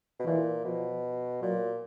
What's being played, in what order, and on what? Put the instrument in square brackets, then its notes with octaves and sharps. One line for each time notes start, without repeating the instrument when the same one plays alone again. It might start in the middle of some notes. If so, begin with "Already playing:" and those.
[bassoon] B2
[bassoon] A#2 [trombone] E3
[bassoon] B2 [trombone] F3
[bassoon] A#2 [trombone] F#3